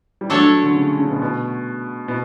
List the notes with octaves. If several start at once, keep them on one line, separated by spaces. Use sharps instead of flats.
G3
F#3 A3 D4 A4 C#5
F#3
D3
C#3
C#3
B2
B2
B2